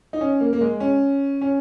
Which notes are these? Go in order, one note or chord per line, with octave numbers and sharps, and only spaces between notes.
D#4
C#4
A#3
A#3
G#3
C#4
C#4